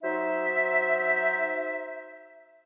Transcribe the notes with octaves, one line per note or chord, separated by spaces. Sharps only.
F#3 D#4 C5 E5